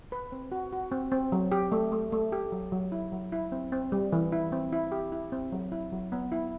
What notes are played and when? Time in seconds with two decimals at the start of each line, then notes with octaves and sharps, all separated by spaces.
0.12 B4
0.32 C4
0.52 F#4
0.72 F#4
0.92 C4
1.12 C4
1.32 F#3
1.52 G4
1.72 A3
1.92 A3
2.12 A3
2.32 G4
2.52 F#3
2.72 F#3
2.92 E4
3.12 F#3
3.32 E4
3.52 C4
3.72 C4
3.92 G3
4.13 E3
4.32 E4
4.52 C4
4.73 E4
4.92 G4
5.12 E4
5.32 C4
5.52 F#3
5.72 E4
5.92 F#3
6.12 B3
6.32 E4